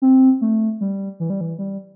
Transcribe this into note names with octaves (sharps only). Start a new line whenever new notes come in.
C4
A3
G3
E3
G3
E3
G3